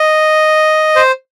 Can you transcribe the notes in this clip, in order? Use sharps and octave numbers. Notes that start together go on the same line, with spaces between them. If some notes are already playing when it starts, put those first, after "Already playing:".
Already playing: D#5
C5